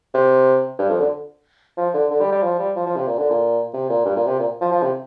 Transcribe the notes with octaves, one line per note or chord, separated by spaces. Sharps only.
C3
G2
F2
D3
F3
D3
D3
G3
G3
F3
G3
F3
F3
C3
A#2
D3
A#2
C3
A#2
G2
A#2
C3
A#2
F3
F3
C3